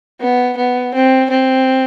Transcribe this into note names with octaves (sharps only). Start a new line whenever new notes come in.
B3
B3
C4
C4